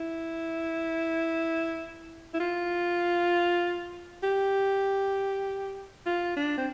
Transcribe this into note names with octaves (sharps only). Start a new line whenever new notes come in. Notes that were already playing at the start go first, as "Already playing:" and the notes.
Already playing: E4
E4
F4
G4
F4
D4
C4